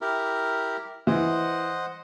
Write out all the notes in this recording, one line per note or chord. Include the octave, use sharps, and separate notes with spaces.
E4 G4 A#4
E3 C5 D#5 F#5